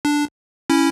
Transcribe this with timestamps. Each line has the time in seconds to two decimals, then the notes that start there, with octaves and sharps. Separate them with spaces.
0.05 D4
0.70 C#4 E4